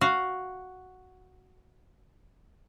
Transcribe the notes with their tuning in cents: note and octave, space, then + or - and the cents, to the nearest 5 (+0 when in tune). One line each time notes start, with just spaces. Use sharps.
F#4 +0 F5 +0